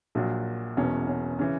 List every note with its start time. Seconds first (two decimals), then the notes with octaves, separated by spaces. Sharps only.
0.15 A#1 A#2 F#3
0.77 E1 E2 B2 F#3 C#4
1.07 C#4
1.39 C#3 E3 C#4